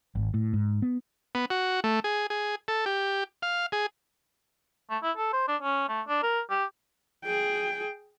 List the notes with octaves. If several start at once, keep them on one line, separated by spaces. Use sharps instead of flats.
G#1
A2
G#2
B3
B3
F#4
A3
G#4
G#4
A4
G4
F5
G#4
A3
E4
A4
C5
D4
C#4
A3
D4
A#4
G4
G#4 G5